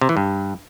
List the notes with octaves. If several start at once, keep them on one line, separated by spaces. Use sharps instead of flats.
C3
E3
G2